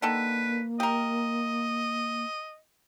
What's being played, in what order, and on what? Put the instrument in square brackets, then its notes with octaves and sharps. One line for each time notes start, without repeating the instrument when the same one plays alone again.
[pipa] D3 D#3 A4 [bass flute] A#3 [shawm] B4
[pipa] G4 A#4 [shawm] D#5